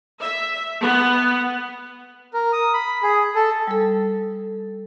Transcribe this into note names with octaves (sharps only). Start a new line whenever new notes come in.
E5
B3
A#4
D#6
B5
G#4
A4
G3 A4